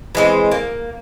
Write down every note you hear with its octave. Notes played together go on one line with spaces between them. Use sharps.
E3 G#3 C4
A#3